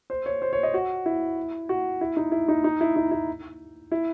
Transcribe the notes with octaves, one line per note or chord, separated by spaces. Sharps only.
C5
C#5
C5
C#5
D#5
F#4
E4
F#4
E4
D#4
E4
D#4
D#4
E4
D#4
E4
E4